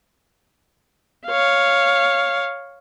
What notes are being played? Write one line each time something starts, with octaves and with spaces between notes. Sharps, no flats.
C#5 F5